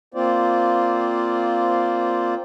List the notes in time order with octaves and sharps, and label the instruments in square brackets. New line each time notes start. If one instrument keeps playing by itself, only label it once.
[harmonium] A#3 C4 F4 C5 D5